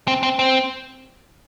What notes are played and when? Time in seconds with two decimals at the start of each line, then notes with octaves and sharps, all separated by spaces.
0.08 C4
0.23 C4
0.39 C4